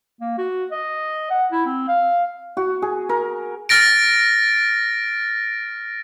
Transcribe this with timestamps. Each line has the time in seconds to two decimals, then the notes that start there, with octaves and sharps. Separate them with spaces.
0.20 A#3
0.38 F#4
0.71 D#5
1.30 F#5
1.51 E4
1.65 C4
1.88 F5
2.57 F#4
2.82 G#4
3.09 A#4
3.69 F6 A6 A#6 D7